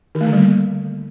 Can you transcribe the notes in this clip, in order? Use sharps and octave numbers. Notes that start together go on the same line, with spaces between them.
D#3
A3
D3
G3
A#3